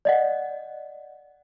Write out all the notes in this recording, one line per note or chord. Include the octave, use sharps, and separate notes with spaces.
D5 D#5 F#5